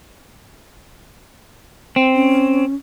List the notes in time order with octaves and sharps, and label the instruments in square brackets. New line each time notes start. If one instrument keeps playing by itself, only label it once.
[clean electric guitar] C4
[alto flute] C#4